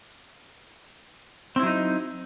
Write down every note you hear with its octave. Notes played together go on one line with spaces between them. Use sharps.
F#3 C4 D#4 E4